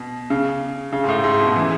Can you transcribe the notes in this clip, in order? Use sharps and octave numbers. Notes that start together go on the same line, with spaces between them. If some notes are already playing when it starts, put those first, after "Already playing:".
Already playing: B2
C#3
C#3
G#2
A2
G#2
B2
E3